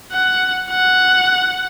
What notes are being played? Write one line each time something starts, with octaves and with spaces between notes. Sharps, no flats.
F#5
F#5